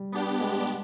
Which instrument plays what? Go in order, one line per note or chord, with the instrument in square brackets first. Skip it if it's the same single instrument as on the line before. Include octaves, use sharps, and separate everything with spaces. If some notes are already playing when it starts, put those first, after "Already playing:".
Already playing: [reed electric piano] G3
[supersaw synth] B3 D4 G4
[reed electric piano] G#3